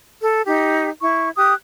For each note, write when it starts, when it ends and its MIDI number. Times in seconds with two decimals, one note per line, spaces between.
0.23 0.42 69
0.45 0.89 63
0.45 0.89 67
1.01 1.29 64
1.01 1.29 85
1.37 1.53 67
1.37 1.53 87
1.37 1.53 90